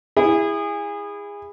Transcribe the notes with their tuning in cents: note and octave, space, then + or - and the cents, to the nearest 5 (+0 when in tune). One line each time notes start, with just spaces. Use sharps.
E4 +0 G#4 -25